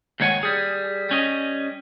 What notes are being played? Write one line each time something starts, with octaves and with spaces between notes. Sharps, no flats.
D#2 G#2 D#3 C#5 F#5 G#5
G3 G#4
G3 C#4 D#5